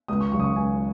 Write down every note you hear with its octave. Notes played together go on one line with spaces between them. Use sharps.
C#2 D#6
C#6
C#3 F#3 C#6
D#6
C#6
C#2 G#5